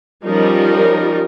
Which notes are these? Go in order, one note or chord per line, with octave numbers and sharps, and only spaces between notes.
F3 G3 C#4 D#4 A#4